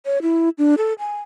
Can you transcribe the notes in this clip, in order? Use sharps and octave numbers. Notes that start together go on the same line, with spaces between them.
C#5
E4
D4
A4
G#5